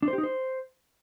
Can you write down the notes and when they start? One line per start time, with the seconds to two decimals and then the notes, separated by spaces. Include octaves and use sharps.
0.03 D4
0.08 C5
0.13 G4
0.18 D#4
0.23 C5